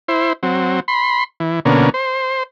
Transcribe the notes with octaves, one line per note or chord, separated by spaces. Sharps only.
E4 C5
F#3 C4
B5 C6
E3
B2 D3 A#3 C#4
C5